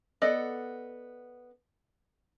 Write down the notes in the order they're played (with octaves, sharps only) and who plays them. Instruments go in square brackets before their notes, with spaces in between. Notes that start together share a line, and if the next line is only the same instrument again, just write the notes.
[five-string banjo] B3 A4 D5 D#5